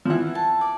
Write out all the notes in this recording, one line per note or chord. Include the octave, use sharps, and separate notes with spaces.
F3
E3 F#5
A5
D5